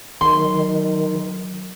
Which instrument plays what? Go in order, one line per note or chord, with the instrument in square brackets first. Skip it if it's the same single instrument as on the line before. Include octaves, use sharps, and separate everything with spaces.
[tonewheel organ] D#3 [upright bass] F#3 [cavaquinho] C6